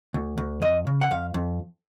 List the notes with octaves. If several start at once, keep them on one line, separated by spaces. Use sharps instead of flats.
D2
D2
F2 D#5
C#3
F#5
F2 F5
F2